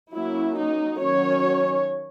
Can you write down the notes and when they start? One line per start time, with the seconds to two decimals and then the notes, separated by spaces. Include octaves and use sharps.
0.12 F#3 A#3 C#4 E4
0.56 D#4
1.00 D#3 F#3 C#4 C#5